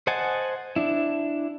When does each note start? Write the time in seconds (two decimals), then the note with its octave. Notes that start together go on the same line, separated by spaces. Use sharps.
0.07 C5 D#5 F#5 G#5 A5
0.76 D4 E4